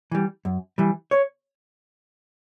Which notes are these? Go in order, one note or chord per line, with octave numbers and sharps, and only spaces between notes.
E3 G3
F#2
E3 G3
C#5